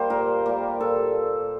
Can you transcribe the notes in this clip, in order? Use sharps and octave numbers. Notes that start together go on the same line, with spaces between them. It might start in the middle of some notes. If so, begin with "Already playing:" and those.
Already playing: G3 A#3 C5
A#2 A#4
G3 A#3
A#2 A4